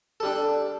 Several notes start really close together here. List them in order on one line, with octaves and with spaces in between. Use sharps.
A4 G3 D4